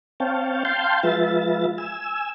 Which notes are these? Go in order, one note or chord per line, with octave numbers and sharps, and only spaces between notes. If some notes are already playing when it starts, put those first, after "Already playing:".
C4 C#5 F5 G5 A5
F5 G5 A5 C6 G6
F3 G#3 F4 B4 E5 A6
G#5 E6